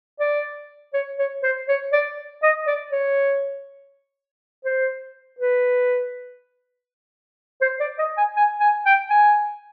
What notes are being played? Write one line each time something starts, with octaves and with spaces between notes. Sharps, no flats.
D5
C#5
C#5
C5
C#5
D5
D#5
D5
C#5
C5
B4
C5
D5
D#5
G#5
G#5
G#5
G5
G#5